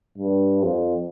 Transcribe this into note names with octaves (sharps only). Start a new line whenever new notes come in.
G2
F2